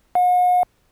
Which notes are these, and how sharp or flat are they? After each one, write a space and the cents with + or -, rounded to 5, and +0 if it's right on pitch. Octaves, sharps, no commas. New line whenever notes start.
F#5 -45